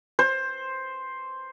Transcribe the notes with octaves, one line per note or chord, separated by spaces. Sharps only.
C5